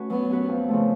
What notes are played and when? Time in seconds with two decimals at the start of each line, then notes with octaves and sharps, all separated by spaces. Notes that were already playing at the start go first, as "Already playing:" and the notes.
Already playing: A3 C#4 F#4 B4
0.10 F#3 B3
0.29 C#4 F#4 B4
0.49 F2
0.69 C#3 F3 A3